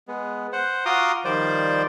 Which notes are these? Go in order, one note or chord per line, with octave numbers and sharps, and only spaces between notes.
G#3 B3
C5 F#5
F4 F#4 A#5 C6 D6 D#6
D#3 F3 G3 C5 D5